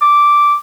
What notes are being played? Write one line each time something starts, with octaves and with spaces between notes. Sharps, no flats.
D6